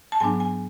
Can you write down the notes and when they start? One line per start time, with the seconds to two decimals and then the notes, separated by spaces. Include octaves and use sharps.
0.12 A5
0.20 G#2 F#3 B3 D4 G#5
0.40 G#5